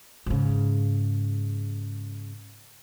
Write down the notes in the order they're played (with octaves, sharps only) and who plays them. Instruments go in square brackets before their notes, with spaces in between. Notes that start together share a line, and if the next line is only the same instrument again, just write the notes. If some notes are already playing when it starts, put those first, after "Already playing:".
[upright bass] G#2 C#3